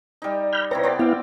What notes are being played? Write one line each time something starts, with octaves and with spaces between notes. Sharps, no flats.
G3 D#4
B5 F6 G6
C3 E4 B4 C#5 G5 A#5
B3 C4 D5
B3 E4 F5 G5